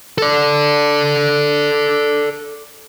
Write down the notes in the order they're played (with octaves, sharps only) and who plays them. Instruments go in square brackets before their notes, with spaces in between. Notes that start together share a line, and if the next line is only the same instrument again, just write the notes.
[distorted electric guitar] A4 D5